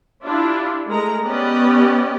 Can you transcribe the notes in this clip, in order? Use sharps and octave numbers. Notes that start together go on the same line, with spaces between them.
D4 E4 F4 G4
G#3 A3 A#4 A#5
B3 C#4 G4 D5 D#5